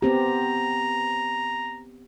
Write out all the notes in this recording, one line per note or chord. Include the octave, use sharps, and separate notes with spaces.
B3 C4 G4 A#5